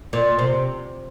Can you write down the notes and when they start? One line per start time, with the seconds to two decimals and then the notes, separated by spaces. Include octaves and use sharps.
0.13 A#2
0.39 C3